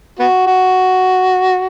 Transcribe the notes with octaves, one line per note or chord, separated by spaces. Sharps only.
B3 F#4
F#4